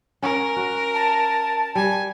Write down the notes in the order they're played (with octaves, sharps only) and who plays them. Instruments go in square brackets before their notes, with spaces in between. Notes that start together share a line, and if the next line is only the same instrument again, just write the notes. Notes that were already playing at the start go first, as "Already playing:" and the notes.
[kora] C#4 [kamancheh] A#4
[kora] F#4
[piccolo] A5
[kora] G3 [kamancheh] G#5